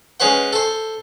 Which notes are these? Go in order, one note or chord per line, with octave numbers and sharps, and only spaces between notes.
G#3 C#4 B4 C5 F#5
A4 C5